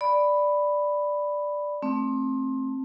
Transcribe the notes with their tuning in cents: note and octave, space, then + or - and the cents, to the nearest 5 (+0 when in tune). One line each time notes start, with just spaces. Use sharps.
D5 +0 B5 +0
A3 +0 C4 +20